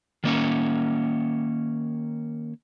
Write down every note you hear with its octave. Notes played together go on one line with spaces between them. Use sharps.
D#3 A#3 C#4